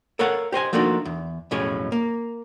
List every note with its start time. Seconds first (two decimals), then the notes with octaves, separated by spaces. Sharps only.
0.19 A4 A#4 C#5 F5 F#5
0.52 G4 C5 D#5 G#5
0.73 F3 A3 A#3 D4 D#4 F#4
1.05 E2
1.51 B1 F2 A2 C#4 G#4 C#5
1.92 A#3